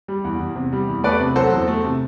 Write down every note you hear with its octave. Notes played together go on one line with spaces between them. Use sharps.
G3
E2
E2
C3
G3
E2
A3 B4 D5
C3
F#3 A4 C5
E2
A3
C3